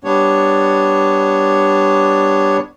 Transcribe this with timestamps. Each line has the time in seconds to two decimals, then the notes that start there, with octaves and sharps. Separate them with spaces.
0.04 G3 B3 D4 C#5